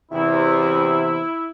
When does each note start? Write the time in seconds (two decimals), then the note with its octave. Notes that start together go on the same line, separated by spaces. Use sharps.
0.12 E2 C3 E4